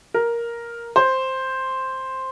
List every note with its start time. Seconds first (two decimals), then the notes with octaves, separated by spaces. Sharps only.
0.14 A#4
0.96 C5